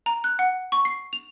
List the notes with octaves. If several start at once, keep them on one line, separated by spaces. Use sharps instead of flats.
A#5
F#6
F#5
C#6
C7
F7